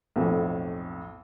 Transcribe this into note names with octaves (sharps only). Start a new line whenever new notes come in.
B1 F2 A2